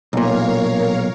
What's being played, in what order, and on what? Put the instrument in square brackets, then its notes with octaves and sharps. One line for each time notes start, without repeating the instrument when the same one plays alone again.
[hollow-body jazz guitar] B1 A#2 [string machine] A#4 C#5 F5